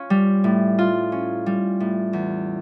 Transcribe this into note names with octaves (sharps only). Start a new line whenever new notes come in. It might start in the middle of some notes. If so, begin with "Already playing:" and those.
Already playing: C#4 F4
G3
A2
F4
C#4
G3
A2
E2